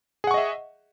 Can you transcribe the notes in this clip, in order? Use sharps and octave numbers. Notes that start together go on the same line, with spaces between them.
G#4 D#5 E5 F#5 C#6